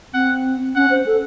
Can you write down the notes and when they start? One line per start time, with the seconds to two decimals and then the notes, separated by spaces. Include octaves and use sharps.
0.14 C4 F#5
0.75 C#4 F#5
0.90 C5
1.06 A4